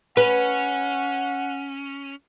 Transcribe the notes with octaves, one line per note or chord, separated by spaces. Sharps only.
C#4 B4 F#5